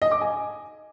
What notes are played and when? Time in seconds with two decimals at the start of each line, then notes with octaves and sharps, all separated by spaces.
0.02 D#5
0.11 D6
0.21 G#5